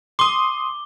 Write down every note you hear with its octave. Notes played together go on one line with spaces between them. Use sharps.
C6 D6 D#6 G7